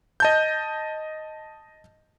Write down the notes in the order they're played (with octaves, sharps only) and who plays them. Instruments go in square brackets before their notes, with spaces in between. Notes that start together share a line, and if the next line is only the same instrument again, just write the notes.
[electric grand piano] D#5 A5 G6